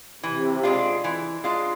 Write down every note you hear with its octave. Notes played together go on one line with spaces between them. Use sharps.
C3 E3
G#3 D4 F4
E3
G#3 D4 F4